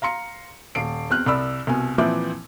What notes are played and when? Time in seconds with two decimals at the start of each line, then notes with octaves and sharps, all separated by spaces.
0.02 F5 A#5 C6 C#7
0.75 D#1 C7 D7
1.10 E2 C4 F6 F#6
1.26 C2 D5 B5 E6
1.67 C2 B2 G#5
1.98 A#2 E3 F3 C4 E4 D6